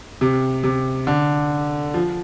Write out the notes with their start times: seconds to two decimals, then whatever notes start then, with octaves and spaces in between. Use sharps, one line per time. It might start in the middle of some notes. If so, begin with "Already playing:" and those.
0.21 C3
0.64 C3
1.07 D3
1.94 F3